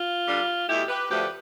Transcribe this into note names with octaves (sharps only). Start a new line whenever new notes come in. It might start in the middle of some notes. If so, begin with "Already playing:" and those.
Already playing: F4
D3 G3 D4
E2 B2 A3 E4 G4
G4 B4
D2 D3 F3 A3 G4 B4